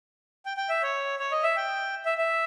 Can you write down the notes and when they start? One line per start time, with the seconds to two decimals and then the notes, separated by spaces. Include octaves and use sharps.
0.46 G5
0.57 G5
0.69 E5
0.82 C#5
1.19 C#5
1.32 D#5
1.43 E5
1.56 G5
2.05 E5
2.18 E5